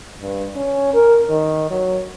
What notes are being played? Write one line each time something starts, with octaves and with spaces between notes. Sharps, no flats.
G2
C#4
A#4
D#3
F#3